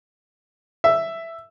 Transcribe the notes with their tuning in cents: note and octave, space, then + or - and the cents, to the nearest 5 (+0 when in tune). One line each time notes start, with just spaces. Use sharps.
E5 +5